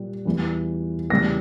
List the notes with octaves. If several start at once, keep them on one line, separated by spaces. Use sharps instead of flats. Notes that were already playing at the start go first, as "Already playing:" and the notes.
Already playing: A#2 G3
E2 E3 G3
E2 C#3 G3 A#6